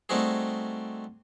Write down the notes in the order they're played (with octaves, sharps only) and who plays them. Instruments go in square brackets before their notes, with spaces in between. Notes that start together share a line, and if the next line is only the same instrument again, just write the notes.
[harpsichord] G3 A3 C4 D#4 F#4 G#4